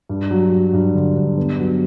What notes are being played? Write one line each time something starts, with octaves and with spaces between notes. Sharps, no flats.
G2
F#3
F#3
G2
D3
G2
B3
F#3